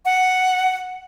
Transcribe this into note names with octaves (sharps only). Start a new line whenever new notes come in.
F#5